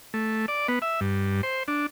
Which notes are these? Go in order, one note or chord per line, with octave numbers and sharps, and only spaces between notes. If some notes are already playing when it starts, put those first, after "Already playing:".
A3
D5
B3
E5
G2
C5
D4